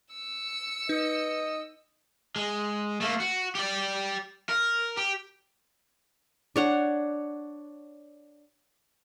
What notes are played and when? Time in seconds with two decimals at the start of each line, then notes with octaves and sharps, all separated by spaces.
0.12 E6 C#7
0.89 D#4 B4 D#5
2.36 G#3
3.01 A3 A#3
3.20 F#4
3.55 G4 D5
4.49 A#4
4.97 G4
6.56 D4 C#5 F#5